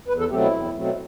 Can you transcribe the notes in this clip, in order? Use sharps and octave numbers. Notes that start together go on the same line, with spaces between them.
E2 B4
A4
B2 F#3 A3 C4 G4
E4
E2
B2 F#3 A3 C4